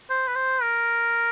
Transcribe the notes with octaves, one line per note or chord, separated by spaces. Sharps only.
C5
B4
C5
A#4